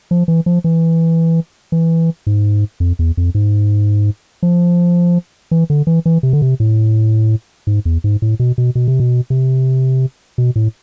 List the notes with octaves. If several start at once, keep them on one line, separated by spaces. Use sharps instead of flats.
F3
E3
F3
E3
E3
G#2
F2
E2
F2
G#2
F3
E3
D3
E3
E3
C3
D3
C3
A2
G#2
E2
G#2
A2
B2
B2
B2
C3
B2
C3
B2
A2